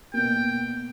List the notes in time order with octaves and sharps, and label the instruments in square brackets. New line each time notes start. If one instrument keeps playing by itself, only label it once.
[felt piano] B2 A#3 [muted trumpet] G5